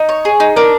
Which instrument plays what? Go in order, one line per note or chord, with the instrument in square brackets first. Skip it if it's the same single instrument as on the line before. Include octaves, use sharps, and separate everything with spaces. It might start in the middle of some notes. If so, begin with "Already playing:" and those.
Already playing: [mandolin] D#4
C#5
G#4
D#4
[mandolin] D4 [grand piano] A#4